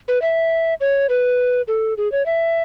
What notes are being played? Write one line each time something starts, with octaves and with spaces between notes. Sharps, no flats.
B4
E5
C#5
B4
A4
G#4
C#5
E5